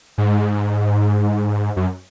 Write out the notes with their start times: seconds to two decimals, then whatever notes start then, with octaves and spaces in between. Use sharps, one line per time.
0.18 G#2
1.76 F#2